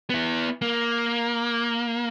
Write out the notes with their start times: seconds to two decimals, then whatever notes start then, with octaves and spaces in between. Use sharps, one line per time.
0.10 B3 E4
0.62 A#3